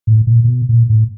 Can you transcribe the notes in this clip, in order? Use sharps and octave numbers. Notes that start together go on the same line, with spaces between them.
A2
A#2
A#2
B2
A#2
A2